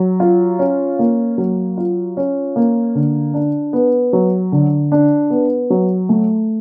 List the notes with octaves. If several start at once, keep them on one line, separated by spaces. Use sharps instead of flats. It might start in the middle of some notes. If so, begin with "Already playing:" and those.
Already playing: F#3
F4
C#4
A#3
F#3
F4
C#4
A#3
D3
D4
B3
F#3
D3
D4
B3
F#3
A3